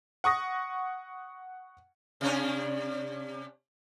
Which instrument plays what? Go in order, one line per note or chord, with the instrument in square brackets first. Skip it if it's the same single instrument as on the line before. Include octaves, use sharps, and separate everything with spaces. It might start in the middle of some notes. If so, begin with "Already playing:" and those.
[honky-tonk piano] F#5 C#6 D#6 A#6
[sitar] C3 C#4 D4